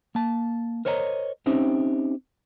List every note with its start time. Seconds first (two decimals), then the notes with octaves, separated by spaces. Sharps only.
0.15 A#3 A5
0.85 A#4 C5 C#5 D#5 F#5 A#5
1.46 C4 C#4 D#4 G4 C5 E5